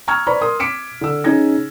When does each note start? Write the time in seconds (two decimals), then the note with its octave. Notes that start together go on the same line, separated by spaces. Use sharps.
0.08 G5 A#5 C#6 E6 F6 G#6
0.27 B4 C5 D5 A#5 B5 C#6
0.41 A#4 C6 D#6
0.60 D6 B6 C#7 D7 E7
1.01 D3 E6
1.24 C#3 C#4 D#4 G#6 A#6